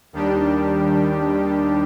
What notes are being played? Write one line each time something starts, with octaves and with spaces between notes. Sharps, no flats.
D#2 D#3 G3 D4 G4